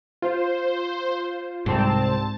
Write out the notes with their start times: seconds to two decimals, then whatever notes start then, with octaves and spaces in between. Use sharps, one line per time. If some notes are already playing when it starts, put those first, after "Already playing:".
0.22 F4 C5
1.66 C2 G#2 C4 A5